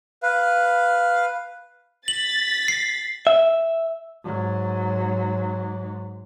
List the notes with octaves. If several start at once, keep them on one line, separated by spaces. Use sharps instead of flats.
B4 F5
A6 B6 F#7
C7
E5
G#2 F#3